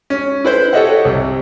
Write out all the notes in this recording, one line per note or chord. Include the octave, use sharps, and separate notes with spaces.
C#4
E4 B4 C5
G4 A4 C#5 D#5 E5 F#5
C2